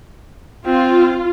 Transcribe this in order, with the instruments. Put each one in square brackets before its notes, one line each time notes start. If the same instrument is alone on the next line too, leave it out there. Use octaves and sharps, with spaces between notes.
[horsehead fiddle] C4 [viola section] F4